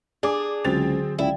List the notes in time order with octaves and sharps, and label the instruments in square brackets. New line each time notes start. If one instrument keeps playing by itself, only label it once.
[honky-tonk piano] D4 D6 [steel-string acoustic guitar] G#4
[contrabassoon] C#2 [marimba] D3 F#3 F#4 [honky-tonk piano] C4 A6 F7
[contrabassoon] C#2 [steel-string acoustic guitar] E4 [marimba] D5 F5 G5